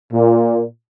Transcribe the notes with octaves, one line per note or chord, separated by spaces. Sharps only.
A#2